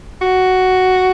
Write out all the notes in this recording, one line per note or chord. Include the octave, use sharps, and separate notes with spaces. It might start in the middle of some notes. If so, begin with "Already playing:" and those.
F#4